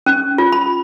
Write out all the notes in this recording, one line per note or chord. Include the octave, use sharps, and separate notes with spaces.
C#4
F4
B5